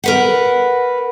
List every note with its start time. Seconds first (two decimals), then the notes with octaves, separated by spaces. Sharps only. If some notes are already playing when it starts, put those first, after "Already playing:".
0.04 A#4 B4 F#5